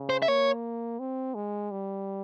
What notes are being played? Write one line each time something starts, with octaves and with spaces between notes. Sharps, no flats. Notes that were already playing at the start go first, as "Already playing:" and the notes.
Already playing: C#3
C5
E5
A#3 C#5
C4
G#3
G3